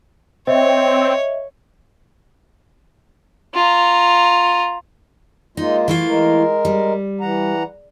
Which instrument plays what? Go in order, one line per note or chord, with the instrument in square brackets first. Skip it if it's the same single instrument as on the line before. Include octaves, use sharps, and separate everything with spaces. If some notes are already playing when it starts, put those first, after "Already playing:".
[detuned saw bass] C4 [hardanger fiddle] C#5 [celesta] D#5 E5
[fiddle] F4 A#5
[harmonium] G#3 A#3 F4 [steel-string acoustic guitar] D#4
[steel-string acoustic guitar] E3 A3 F4
[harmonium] G#3 A#4
[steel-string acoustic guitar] G3
[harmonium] E3 F#5 A#5